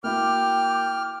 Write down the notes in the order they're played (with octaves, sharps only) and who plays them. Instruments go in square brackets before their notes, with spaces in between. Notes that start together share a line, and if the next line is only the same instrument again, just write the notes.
[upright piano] A#3 E4 F#4 [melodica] G5 [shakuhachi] D6 [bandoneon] F6